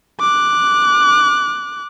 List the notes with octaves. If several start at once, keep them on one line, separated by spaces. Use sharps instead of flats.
D6 F#6